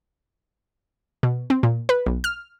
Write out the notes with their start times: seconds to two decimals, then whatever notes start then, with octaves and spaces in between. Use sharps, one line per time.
1.23 B2
1.50 C4
1.63 A#2
1.89 B4
2.06 B1
2.24 F6